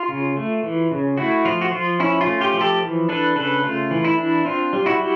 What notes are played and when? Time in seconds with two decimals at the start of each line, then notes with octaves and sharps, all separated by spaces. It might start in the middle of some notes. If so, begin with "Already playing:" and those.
Already playing: F4
0.08 C#3
0.37 A3
0.63 E3
0.91 C#3
1.18 A3 E4 F#4
1.45 F3 F4
1.61 F#4
1.72 F3 F4
2.00 C#4 E4
2.21 F4
2.27 A3
2.41 F4 G4
2.54 F3
2.61 G4 A4
2.82 E3
3.09 D4 A4 B4
3.36 C#3 A4 B4
3.63 A3 F4
3.91 E3
4.05 E4
4.18 D4
4.45 C4 F4
4.73 G3
4.86 E4 F#4
5.00 G3